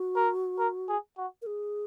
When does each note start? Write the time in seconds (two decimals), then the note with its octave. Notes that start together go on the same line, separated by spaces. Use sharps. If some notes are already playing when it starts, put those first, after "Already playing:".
Already playing: F#4
0.16 A#4
0.59 A#4
0.89 G#4
1.18 F#4
1.42 A#4
1.46 G#4